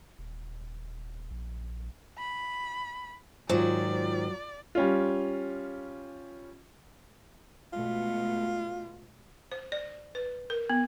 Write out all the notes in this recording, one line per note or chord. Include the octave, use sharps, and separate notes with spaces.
D#1
A#1
B5
G#2 D#3 F#3 F4 C5 D5
G3 C#4 F4
B2 G#3 A3 F4
C5
D5
B4
A#4
B3